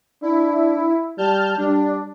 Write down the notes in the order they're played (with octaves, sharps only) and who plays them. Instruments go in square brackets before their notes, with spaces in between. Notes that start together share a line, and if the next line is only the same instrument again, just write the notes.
[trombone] D4 [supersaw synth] E4
[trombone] G3 [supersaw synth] A5 F6 G6
[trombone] G3 [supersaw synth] D4